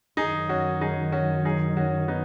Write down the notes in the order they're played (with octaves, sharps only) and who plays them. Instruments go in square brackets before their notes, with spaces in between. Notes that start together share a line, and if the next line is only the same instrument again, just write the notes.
[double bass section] F#2 D#3 F#3 [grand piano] D#4 G#4
[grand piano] C#4 F#4
D#4 G#4
C#4 F#4
D#4 G#4
C#4 F#4
B3 D#4